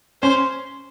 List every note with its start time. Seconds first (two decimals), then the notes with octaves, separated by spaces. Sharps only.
0.22 C#4 C5